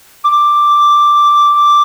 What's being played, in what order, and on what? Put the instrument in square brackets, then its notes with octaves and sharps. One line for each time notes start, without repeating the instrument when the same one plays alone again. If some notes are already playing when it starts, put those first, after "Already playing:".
[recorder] D6